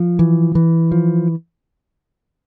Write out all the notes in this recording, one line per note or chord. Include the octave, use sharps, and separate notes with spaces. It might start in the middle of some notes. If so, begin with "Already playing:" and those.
Already playing: F3
E3
E3
F3